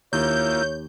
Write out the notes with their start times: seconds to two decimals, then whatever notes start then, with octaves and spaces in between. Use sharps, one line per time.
0.13 D#2 A#3 E4 F4 C#5 G6